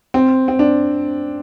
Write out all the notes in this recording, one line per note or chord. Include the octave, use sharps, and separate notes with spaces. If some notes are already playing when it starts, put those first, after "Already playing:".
C4
C4
D4